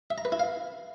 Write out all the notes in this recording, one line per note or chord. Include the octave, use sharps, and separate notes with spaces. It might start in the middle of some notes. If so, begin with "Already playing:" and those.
E5
A#5
B4
E4
F5